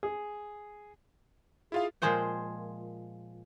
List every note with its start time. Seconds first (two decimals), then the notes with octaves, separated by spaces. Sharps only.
0.03 G#4
1.72 E4 F4 G#4 F5
2.02 A#2 F3 G#3 G#4 C5 G5